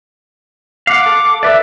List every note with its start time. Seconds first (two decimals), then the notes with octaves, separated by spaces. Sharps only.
0.87 F5 F#5 D6
1.06 A4
1.43 A#4 B4 D5 E5